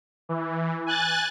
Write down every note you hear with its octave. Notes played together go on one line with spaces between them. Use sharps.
E3
G#5 F#6 A6